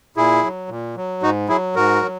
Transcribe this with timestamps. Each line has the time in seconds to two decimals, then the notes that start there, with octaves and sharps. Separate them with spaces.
0.16 A#2 E4 G#4
0.43 F#3
0.69 A#2
0.96 F#3
1.22 G#2 D#4 F#4
1.49 F#3 E4 G#4
1.75 G#2 F#4 A#4
2.02 F#3